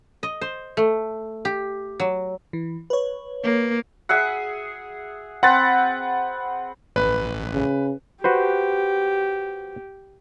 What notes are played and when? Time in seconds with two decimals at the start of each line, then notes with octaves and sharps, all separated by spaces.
0.23 D#5
0.41 C5
0.77 A3
1.45 G4
2.00 F#3
2.53 E3
2.90 B4 C#5
3.43 A#3
4.09 G#4 E5 F#5
5.43 C4 B4 F#5 A6
6.96 A1 B4
7.54 C#3
8.24 F#4 G4 B4 C5